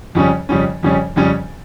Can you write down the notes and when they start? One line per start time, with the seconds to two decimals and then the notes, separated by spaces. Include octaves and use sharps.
0.15 F2 C#3 G3 C#4
0.49 F2 C#3 G3 C#4
0.83 F2 C#3 G3 C#4
1.16 F2 C#3 G3 C#4